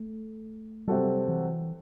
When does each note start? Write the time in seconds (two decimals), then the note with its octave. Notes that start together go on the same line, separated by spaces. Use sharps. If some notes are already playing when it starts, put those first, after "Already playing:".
Already playing: A3
0.87 C3 F#3 G3 C4 F#4 A4
1.28 E3